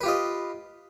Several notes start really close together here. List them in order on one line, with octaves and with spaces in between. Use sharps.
B4 G4 F4 D#5